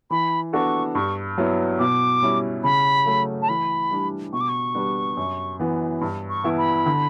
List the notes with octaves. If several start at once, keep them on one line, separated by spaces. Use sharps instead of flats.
E3 B5
B3 D4 F#4 A4 C#6
G2 C#6
F#3 B3 E4
B2 D6
G3 C#4 E4
C#3 B5
F#3 A3
A5
E3 B5
G3 D4
B2 C#6
D6
C#6
G3 B3 D4
F#2
E3 B3
G2
C#6
E3 B3 E4
B5
D3